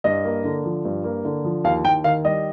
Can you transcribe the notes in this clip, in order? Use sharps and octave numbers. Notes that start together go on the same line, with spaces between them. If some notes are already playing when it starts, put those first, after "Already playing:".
G2 D#5
A#3
D3
F3
G2
A#3
D3
F3
D#2 F5
D#2 G5
D#3 F5
G3 D#5